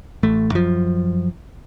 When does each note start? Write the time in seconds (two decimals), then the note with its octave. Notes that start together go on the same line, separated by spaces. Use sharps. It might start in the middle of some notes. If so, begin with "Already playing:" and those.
0.23 A1 A3
0.52 F#2 F3